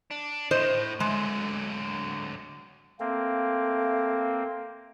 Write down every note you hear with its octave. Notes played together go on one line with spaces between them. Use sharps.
D4
A2 C5 D#5
D3 F#3 G#3
A3 A#3 C4 F5